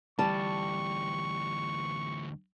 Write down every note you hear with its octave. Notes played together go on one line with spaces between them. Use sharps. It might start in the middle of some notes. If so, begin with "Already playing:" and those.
D2 E3 G3 A5 C#6